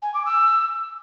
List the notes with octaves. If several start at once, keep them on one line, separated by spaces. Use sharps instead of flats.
G#5
D6
E6